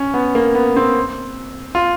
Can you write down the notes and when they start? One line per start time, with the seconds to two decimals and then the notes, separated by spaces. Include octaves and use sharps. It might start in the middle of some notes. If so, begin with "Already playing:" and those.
Already playing: C#4
0.14 B3
0.35 A#3
0.55 B3
0.76 C4
1.75 F4